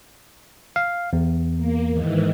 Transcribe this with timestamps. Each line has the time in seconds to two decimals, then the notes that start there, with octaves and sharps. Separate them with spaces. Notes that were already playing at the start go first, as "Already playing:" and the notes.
0.76 F5
1.13 E2
1.57 A#3
1.90 G#2 D#3 E3